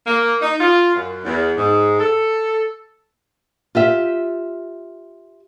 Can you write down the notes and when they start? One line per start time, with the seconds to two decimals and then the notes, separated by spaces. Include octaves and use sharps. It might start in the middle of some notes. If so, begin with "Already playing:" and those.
0.07 A#3
0.42 D#4
0.61 F4
0.95 F#2
1.25 E2
1.57 G#2
1.99 A4
3.75 F4 G4 E5